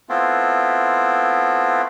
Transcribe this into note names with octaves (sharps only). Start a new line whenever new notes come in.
A3 B3 C4 E4 F4